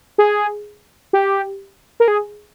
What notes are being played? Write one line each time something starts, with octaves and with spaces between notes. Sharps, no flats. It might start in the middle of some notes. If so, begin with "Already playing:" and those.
G#4
G4
A#4
G#4